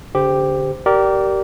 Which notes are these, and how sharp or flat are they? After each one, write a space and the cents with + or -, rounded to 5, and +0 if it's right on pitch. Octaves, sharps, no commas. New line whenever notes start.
D3 -40 G4 +5 C5 -15
G4 -25 A#4 +0 D5 +0